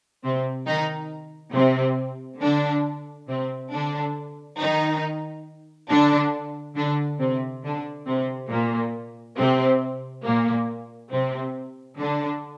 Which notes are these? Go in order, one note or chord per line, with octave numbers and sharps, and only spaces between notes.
C3 C4
D#3 D#4
C3 C4
D3 D4
C3 C4
D3 D4
D#3 D#4
D3 D4
D3 D4
C3 C4
D3 D4
C3 C4
A#2 A#3
C3 C4
A#2 A#3
C3 C4
D3 D4